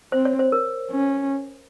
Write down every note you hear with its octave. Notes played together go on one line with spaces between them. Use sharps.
C4 C5
C#5
C5
A#4
C#4